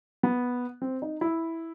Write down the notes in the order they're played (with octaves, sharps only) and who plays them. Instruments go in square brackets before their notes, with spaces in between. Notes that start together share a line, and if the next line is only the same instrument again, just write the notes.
[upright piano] B3
C4
D#4
E4